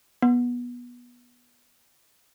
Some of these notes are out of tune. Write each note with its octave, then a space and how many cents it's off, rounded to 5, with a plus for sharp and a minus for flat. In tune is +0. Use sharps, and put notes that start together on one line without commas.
B3 -20